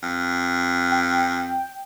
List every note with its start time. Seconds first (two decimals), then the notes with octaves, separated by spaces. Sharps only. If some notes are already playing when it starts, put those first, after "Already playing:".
0.03 F2
0.91 G5